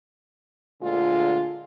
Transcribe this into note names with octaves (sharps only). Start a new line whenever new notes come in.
D2 A#2 D3 G#3 F4